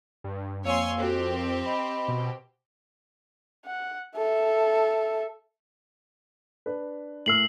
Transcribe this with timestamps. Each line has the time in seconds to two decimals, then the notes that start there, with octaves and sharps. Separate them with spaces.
0.24 G2
0.65 F2 A#3 C#5 F5 G#5 C6 E6
0.98 C4 F#4 G4 A4
1.30 A#4
1.64 D#5 B5 C6
2.08 B2
3.66 F#5
4.17 A4 E5
6.66 D4 B4
7.26 A2 A#4 E6 F6 C7 F#7